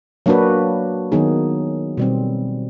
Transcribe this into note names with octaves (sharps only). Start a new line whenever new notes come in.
F#3 A#3 D4 F#4 B4
D#3 F#3 B3 D#4 G#4
B2 G3 C4